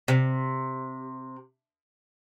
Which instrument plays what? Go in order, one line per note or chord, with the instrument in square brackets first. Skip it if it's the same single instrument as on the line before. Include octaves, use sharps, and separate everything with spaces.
[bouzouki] C3